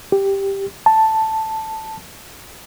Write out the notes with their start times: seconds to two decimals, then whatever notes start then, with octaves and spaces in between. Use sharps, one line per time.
0.12 G4
0.86 A5